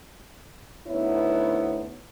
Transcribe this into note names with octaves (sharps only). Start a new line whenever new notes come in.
D2 B3 D#4 E4 C#5